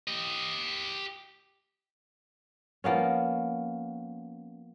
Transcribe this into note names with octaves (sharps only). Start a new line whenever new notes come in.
G4 D#5
F3 A#3 B3 C#4